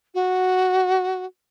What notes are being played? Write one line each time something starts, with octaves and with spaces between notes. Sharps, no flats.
F#4